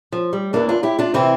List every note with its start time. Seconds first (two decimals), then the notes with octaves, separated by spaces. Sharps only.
0.12 F3
0.33 G3
0.53 E2 E3 A#3 D4
0.69 D4 F4
0.83 E4 G4
0.99 D4 F4
1.14 C3 E3 C4 E4